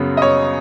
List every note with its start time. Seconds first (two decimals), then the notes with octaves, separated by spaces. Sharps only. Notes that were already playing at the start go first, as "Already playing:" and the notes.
Already playing: F#2 C#3 F#3 B3
0.17 D#5
0.22 C#5